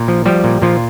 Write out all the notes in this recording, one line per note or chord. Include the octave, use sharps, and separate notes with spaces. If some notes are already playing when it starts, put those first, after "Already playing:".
Already playing: A#2
F3
F3 G3 G4
A#2
A#2 F3 F4